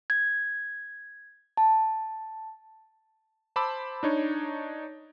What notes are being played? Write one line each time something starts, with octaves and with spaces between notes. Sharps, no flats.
G#6
A5
C5 A5 B5 D6 E6
D4 D#4 C#5